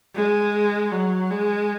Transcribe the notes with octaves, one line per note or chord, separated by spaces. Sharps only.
G#3
F#3
G#3